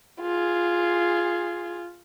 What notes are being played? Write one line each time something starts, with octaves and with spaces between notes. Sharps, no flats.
F4 G#4